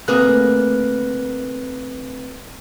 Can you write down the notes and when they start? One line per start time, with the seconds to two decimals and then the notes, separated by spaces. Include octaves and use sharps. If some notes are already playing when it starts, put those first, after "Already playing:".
0.08 D2 A#3 C4 G#4 B4 F#6